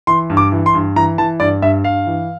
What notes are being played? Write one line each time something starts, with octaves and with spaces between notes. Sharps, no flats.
E3 C6
G2
D6
E3
C6
G2
E3 A#5
E3 A5
G2 D5
G2 E5
G2 F5
E3